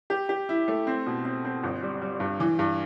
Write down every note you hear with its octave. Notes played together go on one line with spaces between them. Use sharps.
G4
G4
E4
A3
C4
B2
C4
C4
G1
G3
G3
G2
E3
G2